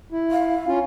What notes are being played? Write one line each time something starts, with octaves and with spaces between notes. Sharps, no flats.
E4
F5
C#4 F4